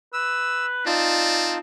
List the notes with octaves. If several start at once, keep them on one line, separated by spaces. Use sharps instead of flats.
B4 E6
C4 D#4 F4 D5 A5